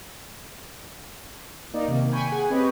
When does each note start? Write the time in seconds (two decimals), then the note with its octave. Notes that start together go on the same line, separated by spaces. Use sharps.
1.74 A#3 D#4 D5
1.88 C3 D#3 A#3
2.12 G5 G#5 B5 C#6
2.29 G#4 F#5 G#5
2.50 C4 G4 B4 C#5 D#5